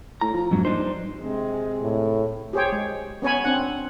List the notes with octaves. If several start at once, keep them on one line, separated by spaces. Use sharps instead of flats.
A2 A#5
F3
A#1 F2 G#2 F#3
D4 D#4 C5
G2
C3 G#3
A2
G4 G#4 C5 C#5 G5
G#3
B3 C#4 C#5 G#5 B5
C4 D4 F#5